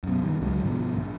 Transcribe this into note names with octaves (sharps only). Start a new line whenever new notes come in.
F#2 B2
G2 D#3
C#2 D3 F#3 G#3
G2 B2 D3 F3
A#1